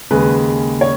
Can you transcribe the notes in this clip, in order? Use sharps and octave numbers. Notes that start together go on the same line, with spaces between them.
D#2 C#3 G#3 B4
C#5